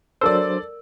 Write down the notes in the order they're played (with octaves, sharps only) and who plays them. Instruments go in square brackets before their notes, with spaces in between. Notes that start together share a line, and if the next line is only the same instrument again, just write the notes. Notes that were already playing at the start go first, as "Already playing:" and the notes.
[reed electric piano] F#3 D4 C5 [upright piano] A4 D5 [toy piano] A#4 E6